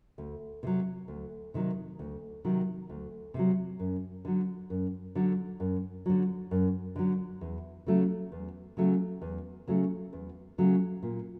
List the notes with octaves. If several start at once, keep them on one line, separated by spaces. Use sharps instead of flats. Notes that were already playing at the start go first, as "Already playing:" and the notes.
D2
C3 D#3 F#3
D2
C3 D#3 F#3
D2
C3 D#3 F#3
D2
C3 D#3 F#3
F#2
D3 F#3
F#2
D3 F#3
F#2
D3 F#3
F#2
D3 F#3
E2
C#3 F#3 A3
E2
C#3 F#3 A3
E2
C#3 F#3 A3
E2
C#3 F#3 A3
A#2